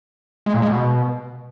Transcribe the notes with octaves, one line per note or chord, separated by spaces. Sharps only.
G#3
A#2
G#3
B2